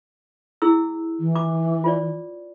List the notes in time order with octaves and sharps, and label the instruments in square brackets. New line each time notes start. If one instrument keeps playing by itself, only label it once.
[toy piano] E4 G#4 E6
[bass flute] E3
[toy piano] D6
F4 C5 D5